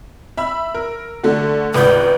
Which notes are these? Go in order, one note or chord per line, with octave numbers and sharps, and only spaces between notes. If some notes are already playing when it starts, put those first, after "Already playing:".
E5 B5 E6
A#4
D3 A3 F#4
G#1 C#2 B4 G6